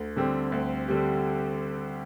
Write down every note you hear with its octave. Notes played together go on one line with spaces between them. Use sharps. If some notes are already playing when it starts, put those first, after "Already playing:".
Already playing: D2
D3 G3 C4 G4
D2
D3 G3 C4 G4